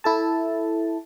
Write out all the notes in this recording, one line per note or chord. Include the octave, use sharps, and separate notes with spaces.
E4 A4 A5